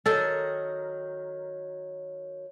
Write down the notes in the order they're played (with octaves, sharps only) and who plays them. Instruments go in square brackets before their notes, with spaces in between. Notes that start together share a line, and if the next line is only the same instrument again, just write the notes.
[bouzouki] D#3 F#3 A#4 [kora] A4